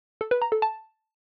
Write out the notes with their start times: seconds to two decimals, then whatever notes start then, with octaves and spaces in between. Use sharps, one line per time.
0.21 A4
0.31 B4
0.42 A#5
0.52 A4
0.62 A5